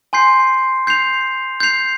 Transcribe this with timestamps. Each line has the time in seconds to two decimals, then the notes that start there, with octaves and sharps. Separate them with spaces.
0.13 G#5 C6 G6 C7
0.87 G6 C7 F7
1.60 G6 C7 F7